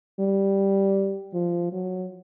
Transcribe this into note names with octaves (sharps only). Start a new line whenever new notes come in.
G3
F3
F#3